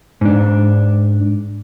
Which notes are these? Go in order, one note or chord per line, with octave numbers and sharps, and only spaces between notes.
G#2 D4